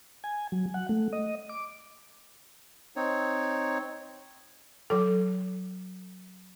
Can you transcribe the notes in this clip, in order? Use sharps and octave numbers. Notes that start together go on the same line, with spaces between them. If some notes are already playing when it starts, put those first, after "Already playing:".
G#5
F#3
F#5
A3
D#5
D6
C4 D#4 C#5
F#3 A4